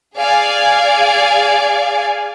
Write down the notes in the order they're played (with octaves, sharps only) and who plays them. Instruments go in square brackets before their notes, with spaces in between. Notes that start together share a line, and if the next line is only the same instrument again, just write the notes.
[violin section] G#4 D5 F5 G#5